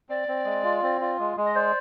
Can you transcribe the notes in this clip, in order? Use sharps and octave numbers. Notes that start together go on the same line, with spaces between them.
C4 D5
C4
G#3
F4
C4
F4
G#3
G#3
D#5
C5 D5